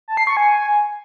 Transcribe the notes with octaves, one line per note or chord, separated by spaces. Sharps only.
A5
C7
C#6
G#5